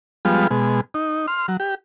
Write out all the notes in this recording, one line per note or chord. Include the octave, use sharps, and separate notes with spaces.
F3 G3 G#3 B3 F4
B2 G#3
D#4
C6 F6
F#3
G4